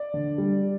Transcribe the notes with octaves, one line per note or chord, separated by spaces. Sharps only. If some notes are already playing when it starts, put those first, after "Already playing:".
Already playing: D5
D3
G3